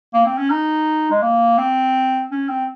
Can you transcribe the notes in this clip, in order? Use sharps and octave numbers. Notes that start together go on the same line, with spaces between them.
A#3
C4
C#4
D#4
G#3
A#3
C4
C#4
C4